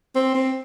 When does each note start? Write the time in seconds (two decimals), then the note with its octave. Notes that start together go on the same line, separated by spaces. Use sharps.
0.15 C4
0.35 C4